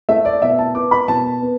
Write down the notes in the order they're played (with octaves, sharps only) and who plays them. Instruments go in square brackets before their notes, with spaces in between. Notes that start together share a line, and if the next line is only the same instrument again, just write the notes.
[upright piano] A3 E5
D5
B2 E5
A5
B3 D6
B5
B2 A5
B3